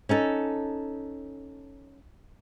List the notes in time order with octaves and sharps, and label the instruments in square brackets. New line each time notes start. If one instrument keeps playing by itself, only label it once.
[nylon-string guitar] C#4 D#4 A4